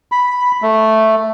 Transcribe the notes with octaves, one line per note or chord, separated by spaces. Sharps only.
B5
A3